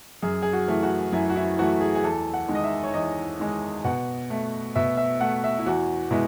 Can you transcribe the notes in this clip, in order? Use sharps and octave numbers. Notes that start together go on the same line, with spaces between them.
F#2 G#4
G#4
F#4
E3 A3
F#4
F#2 E4
F#4
E4
E3 A3 F#4
G#4
G#4
E2 A4
F#5
D#3 G#3
D#5
E5
C#5
E2 D#5
D#3 G#3
B2 F#5
A3
B2 E5
E5
A3 F#5
E5
E4
E2 F#4
B2 G#3 E4